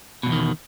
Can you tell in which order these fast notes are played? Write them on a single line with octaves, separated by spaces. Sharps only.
B2 G#2 E2 D#3